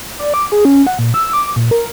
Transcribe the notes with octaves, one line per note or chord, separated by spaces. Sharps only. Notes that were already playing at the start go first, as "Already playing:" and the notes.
D5
D6
G#4
C#4
F#5
A#2
E6
D6
A#2
A#4